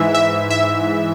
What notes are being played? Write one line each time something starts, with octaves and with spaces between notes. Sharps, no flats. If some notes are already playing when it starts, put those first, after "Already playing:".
Already playing: G#2 E3 E5
E5
E5